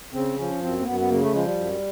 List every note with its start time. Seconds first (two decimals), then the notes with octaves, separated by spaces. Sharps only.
0.14 C#3 C4
0.38 F3 C#4
0.62 F#2 C4
0.80 A#3
0.86 F#2 B3
1.00 B3
1.10 C#3 A#3
1.21 A3
1.33 F3 G#3
1.45 G3
1.57 F#2